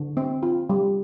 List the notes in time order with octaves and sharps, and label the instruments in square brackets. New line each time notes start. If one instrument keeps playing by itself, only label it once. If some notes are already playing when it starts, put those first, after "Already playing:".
Already playing: [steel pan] D3
C4
F4
G3